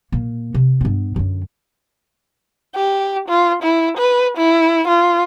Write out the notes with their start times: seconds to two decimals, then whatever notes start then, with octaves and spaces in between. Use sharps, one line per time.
0.12 A#2 A#3
0.54 C3
0.81 G2 B3
1.16 F#2 D3
2.75 G4
3.28 F4
3.63 E4
3.97 B4
4.38 E4
4.88 F4